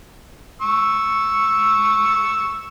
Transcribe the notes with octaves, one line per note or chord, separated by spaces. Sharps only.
C#6 E6